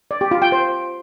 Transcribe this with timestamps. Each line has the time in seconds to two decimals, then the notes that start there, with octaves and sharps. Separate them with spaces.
0.11 D5
0.21 G4
0.31 F4
0.42 G5
0.52 C5